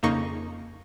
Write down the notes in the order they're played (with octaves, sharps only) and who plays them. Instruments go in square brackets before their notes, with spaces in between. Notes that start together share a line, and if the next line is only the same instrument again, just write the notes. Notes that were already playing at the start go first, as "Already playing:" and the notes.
[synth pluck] F2 C#3 A#3 D#4 C#6 A#6